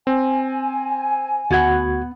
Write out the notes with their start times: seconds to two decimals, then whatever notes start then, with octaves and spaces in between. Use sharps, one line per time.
0.07 C4 G#5
1.50 D2 B3 F#4 F#5 G#6